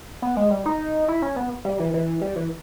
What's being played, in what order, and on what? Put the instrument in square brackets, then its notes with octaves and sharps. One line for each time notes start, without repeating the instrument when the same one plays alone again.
[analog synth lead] B3
G#3
G3
D#4
E4
C#4
B3
G3
E3
E3
G3
E3